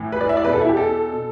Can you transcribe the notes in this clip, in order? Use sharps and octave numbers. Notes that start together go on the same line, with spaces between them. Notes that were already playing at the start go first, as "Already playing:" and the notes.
Already playing: A2 E3
B4
D5
E5
D5
E2 B2 B4
A4
E4
G4
A4
B2